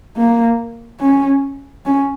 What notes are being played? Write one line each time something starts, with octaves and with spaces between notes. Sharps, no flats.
A#3
C#4
C#4